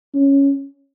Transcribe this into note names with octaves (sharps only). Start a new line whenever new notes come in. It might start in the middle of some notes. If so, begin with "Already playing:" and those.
C#4